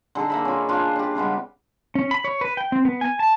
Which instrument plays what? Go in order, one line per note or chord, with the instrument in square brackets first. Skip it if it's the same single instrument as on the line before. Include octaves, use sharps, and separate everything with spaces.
[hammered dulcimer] D3 D#4 G#4 A4
A#3 E5 B5
C#4 F4
D4 F4
D4 G4
C#3 G3 G#3 B3
[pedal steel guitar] C#4
B5
C#5
B4
G5
C4
B3
G#5
A5